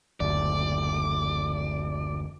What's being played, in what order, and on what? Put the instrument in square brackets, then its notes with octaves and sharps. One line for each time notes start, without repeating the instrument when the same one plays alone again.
[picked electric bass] F#1 D2 [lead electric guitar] D5